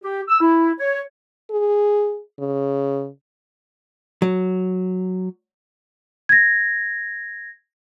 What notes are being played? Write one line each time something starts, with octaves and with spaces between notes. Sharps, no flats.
G4
E6
E4
C#5
G#4
C#3
F#3
G#6 A#6